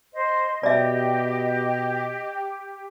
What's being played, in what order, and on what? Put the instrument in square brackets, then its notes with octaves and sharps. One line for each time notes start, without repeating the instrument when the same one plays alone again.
[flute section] C5 [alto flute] D#5
[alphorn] B2 [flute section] G4 [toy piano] D5 E5